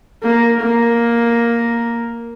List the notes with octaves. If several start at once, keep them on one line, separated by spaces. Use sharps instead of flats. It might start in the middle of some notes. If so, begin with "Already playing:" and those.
A#3
A#3